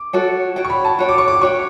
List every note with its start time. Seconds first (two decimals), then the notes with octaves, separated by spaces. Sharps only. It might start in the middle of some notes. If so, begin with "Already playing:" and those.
Already playing: D6
0.13 F#4 A4 C#5 G5
0.56 F#4 C#5 G5
0.65 C#6
0.70 B5
0.85 A5
0.99 F#4 C#5 G5
1.09 D6
1.18 C#6
1.28 D6
1.41 F#4 C#5 G5 C#6